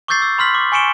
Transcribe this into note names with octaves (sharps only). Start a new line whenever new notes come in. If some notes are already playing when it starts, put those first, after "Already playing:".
C#6 D6 E6 G6 A6 C7
E6
B5 C6 F6 B6 F#7
D6
G#5 C#6 C#7 D7 E7 G7